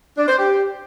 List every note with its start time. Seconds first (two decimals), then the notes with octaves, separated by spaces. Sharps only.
0.17 D4
0.28 C5
0.38 G4